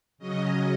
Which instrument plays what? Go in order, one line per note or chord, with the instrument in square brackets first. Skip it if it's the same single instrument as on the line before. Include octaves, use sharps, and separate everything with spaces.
[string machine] C#3 F#3 C#4 D#5